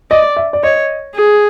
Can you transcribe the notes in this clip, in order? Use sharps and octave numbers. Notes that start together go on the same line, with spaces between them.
D5 D#5
E5
D5
C#5 D#5
G#4